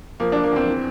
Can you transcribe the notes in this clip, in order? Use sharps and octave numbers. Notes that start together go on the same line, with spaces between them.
F3 A#3
F3 D4
A#3
E2 C4
E3